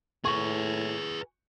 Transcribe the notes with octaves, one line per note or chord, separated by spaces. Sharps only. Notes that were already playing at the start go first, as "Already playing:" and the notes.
A2 G#4 B4 C#6